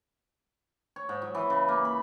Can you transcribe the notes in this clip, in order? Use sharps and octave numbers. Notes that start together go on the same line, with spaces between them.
C#5
G#2
F#3
E3
C#3
A#3
B5